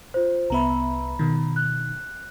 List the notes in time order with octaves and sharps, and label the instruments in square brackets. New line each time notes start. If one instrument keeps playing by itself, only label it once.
[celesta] F4 C5
[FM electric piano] C2 B3 E5 [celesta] A#5 B5
[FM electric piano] B2 D#3
[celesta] F#6